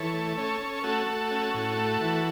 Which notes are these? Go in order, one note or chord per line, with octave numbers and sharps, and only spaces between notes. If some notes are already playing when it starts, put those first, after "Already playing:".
Already playing: E3 A4 C#5
A3
C#4 A4 C#5
C#4
A3 F#4 A4
A3
C#4
A2
A3
E3